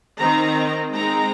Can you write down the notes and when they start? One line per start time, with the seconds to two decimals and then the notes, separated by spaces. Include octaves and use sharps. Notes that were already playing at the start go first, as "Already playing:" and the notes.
0.17 D#3 C4 D#4 A#5
0.93 G#3 C4 D#4 A#5